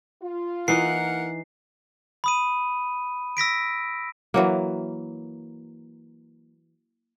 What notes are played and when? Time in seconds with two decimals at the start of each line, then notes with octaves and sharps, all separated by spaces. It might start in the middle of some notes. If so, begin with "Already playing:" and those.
0.22 F4
0.68 E3 A#3 D#4 A#4 F#5 C7
2.24 B5 D#6 D#7
3.37 E6 A#6 B6 D7
4.34 E3 F#3 A#3